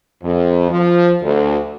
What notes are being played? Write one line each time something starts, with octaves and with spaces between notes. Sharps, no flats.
F2
F3
D2